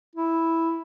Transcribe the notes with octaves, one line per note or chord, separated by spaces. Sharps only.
E4